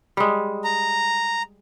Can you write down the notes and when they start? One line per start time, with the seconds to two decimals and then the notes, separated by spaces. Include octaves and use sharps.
0.17 G3 G#3
0.64 A#5